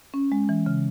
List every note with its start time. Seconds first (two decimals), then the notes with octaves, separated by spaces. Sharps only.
0.14 C#4
0.32 G#3
0.49 E3
0.66 C#3